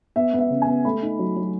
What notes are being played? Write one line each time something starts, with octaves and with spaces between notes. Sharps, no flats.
B3 E5
B3
E5
C#3
G#5
B3
A3 B5
D#4
F#3
F#3